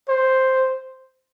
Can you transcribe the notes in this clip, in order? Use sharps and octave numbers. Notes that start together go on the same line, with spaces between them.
C5